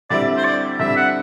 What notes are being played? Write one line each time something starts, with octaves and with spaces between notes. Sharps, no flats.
D3 G3 C4 E4 D5
C5
D5
D3 G3 C4 E4 E5
F#5